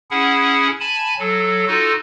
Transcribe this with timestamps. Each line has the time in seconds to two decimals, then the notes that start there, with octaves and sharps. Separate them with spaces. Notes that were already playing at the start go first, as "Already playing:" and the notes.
0.11 C#4 E4 G#4 F#5
0.80 G#5 A5 B5
1.19 F#3 A4
1.67 D#4 F4 F#4 A4